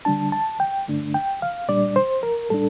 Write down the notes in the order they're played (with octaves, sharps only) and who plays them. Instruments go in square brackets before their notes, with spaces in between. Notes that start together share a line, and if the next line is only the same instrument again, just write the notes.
[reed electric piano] D3 G3 D4 A5
A5
G5
G2 D3 A3 D4
G5
F5
A#2 G3 D4 D5
C5
A#4
A2 G3 D4 A4